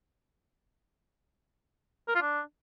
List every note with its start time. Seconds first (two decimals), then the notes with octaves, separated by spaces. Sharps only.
2.08 A#4
2.15 F4
2.22 D4